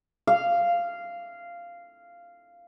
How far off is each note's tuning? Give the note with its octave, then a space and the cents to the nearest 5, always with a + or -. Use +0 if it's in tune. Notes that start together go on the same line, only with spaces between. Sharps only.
F5 -10